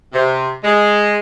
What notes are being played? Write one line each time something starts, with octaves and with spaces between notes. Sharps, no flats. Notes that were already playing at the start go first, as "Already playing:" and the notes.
C3
G#3